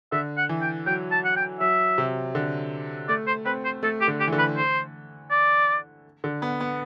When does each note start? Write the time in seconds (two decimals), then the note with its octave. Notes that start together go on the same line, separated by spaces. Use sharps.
0.12 D3 E5
0.37 F#5
0.49 E3
0.61 G5
0.86 F#3 G5
1.11 A5
1.25 F#5
1.36 G5
1.60 F#3 E5
1.98 C3
2.35 D3
3.08 A3 D5
3.27 C5
3.45 C4 B4
3.64 C5
3.83 A3 A4
4.01 G4
4.08 D3
4.20 G4
4.27 E3
4.32 D3
4.38 B4
4.57 C5
5.31 D5
6.24 D3
6.42 B3
6.61 B3